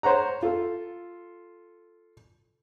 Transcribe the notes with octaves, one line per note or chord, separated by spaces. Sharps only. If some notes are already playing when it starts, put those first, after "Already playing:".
C5 C#5 F#5 A#5
F4 A4